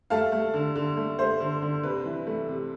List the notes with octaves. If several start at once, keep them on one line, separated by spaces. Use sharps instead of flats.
A3 F5 A5
A3
D3
D3
A3
A3 C5
D3
D3
C3 B4
E3
A3
C3